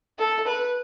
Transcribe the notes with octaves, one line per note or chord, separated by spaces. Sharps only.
A4
B4